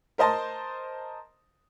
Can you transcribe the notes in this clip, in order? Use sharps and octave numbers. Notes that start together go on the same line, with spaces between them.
A#4 C5 D#5 A5 C6